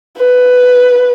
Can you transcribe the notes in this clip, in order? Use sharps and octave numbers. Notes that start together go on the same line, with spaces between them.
B4